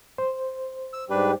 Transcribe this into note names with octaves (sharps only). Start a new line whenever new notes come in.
C5
E6
G#2 G3 D4 G4 B4